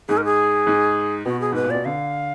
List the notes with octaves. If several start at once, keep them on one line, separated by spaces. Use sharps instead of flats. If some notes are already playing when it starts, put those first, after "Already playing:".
G#2 G#4
A#4
G#4
G#2
B2 F#4
G#4
G#2 B4
A#2
B2 D5
D3 F5